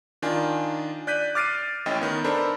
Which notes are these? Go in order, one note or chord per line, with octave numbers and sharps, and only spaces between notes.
D#3 D4 F4 G#5
D5 F#6 G6 B6 D#7
D6 F6 A6 C7 D7 D#7
A1 A2 C#4 D#5 G5
D#3 B3
D4 A4 A#4 C5 B5